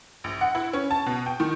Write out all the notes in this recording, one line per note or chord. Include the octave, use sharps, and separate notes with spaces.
A#1
F#5
E4
C#4
A5
B2
G5
D#3